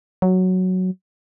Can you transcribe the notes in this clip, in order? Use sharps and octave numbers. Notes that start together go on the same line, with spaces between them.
F#3